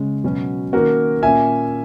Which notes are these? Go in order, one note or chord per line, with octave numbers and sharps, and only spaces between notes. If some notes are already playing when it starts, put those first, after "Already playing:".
Already playing: C#3 G#3 C#4
B2 F#3 C#4
D#3 A#3 C#4 F#4 A#4
A#2 A#3 C#4 E5 G#5